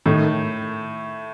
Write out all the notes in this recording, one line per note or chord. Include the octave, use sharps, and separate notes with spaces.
A2 D#3 A3